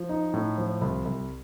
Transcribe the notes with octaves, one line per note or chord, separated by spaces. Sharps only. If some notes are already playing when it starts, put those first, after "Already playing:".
Already playing: F3
D#4
A2
F3
C2
C2